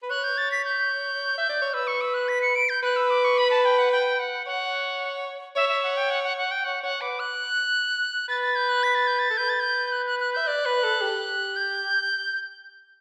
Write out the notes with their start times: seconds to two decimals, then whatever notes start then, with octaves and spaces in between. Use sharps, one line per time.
0.03 B4
0.10 C#5 F#6
0.24 G6
0.38 A6
0.51 B6
0.65 G6
1.38 E5
1.49 D5
1.62 C#5
1.73 B4 E6
1.87 C#6
2.01 E6
2.14 F#6
2.28 B6
2.42 C#7
2.56 D7
2.69 G6
2.83 B4 F#6
2.96 E6
3.10 D6
3.24 C#6
3.38 B5
3.51 A5
3.65 G5
3.78 F#5
3.92 G5
4.19 F#5
4.47 C#5 F#5
5.56 C#5 E5
5.69 E5
5.83 F#5
5.97 G5
6.10 F#5
6.24 F#5
6.38 F#5
6.51 G5
6.65 C#5 F#5
6.83 C#5 F#5
7.01 B4 D6
7.20 F#6
8.28 B4 A6
8.42 A6
8.56 G6
8.69 F#6
8.83 B6
8.95 A6
9.07 G6
9.19 A6
9.30 A4
9.37 B4 G6
9.49 A6
9.60 G6
9.92 F#6
10.06 F#6
10.20 F#6
10.33 E5 G6
10.47 D5 F#6
10.66 B4
10.83 A4
11.01 G4
11.56 G6